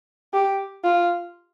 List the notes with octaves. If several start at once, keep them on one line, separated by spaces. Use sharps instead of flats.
G4
F4